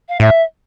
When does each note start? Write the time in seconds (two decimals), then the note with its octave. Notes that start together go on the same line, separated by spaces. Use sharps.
0.09 F5
0.20 A2 E5